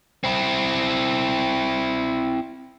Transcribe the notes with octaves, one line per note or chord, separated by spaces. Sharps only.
C4 E4